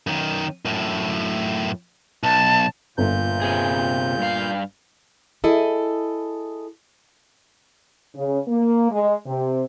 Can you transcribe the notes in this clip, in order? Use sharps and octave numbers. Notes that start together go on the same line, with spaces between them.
F#2 D#3
F#2 A2
B1 A5
G1 A#2 G6
C3 G#4
G2 F5
E4 G#4 A4 D#5
C#3
A#3
G#3
C3